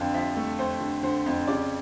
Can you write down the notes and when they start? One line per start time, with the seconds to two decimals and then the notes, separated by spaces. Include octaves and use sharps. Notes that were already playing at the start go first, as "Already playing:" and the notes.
Already playing: F2 D3 F5
0.14 F3 E5
0.37 A3
0.59 F2 C5
0.80 D3
1.03 D3 C5
1.26 F2
1.48 C#3 D5